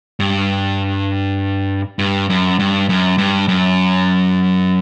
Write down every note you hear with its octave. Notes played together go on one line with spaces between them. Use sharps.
G2
G2
F#2
G2
F#2
G2
F#2